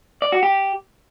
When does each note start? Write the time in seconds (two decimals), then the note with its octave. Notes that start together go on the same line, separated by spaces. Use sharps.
0.22 D5
0.32 F#4
0.43 G4